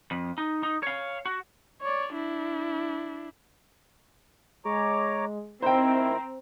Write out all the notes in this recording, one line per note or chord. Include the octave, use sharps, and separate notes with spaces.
F2
D#4
D#4
C#5 F5
F#4
C#5 D5
D4 E4
G#3 C#5 A#5 D6
D#3 C4 E4 C5 G5 A#5